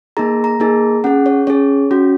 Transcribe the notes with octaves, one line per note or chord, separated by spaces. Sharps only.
A#3 D#4 G#4 A#5
A#5
A#3 D#4 G#4
C#4 G#4 F#5
C#5
C#4 G#4 C#5
C#4 F#4